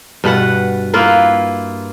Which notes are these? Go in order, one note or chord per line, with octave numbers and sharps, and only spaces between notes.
G2 B2 B4 F#5
A#3 E4 F4 B4